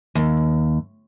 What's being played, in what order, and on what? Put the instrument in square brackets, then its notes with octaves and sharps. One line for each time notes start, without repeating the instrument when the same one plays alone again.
[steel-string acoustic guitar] D#2